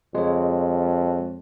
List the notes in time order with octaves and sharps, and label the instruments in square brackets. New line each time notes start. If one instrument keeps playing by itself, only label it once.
[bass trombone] F2 [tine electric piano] G#3 C#5